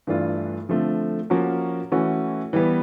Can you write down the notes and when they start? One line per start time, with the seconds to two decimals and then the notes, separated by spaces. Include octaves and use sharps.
0.07 G2 E3 A3 D4 F4
0.69 D3 F3 A3 C4
1.30 F3 A#3 C#4 F#4 A#4
1.92 E3 A3 C#4 F#4
2.53 E3 G3 B3